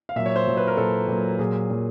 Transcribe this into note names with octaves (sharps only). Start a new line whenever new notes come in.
F5
A#2 F#3 E5
C#5
C5
A#2 F#3
B4
A#4
A#2 F#3 A4
A#2 F#3
A#2 F#3 G#4
A#2 F#3